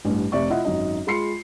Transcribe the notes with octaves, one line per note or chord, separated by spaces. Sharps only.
A1 G2
F1 C3 D5 E5 C#6
E4 F4 D#5 E5 F#5
G#1 F#2 D#4 D#5
G#3 F4 B5 C6 C7 C#7